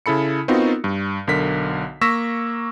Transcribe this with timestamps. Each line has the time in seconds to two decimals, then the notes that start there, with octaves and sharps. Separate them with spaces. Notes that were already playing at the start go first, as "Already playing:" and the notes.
0.06 C#3 E4 A4 B5 C#7
0.48 B3 C4 D#4 F4 F#4 A#4
0.84 G2
1.27 B1 D3 A#4 B6
2.01 A#3 C#6 E6 A#6 B6 E7